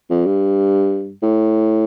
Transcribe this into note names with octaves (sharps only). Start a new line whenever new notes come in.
F2
G2
A2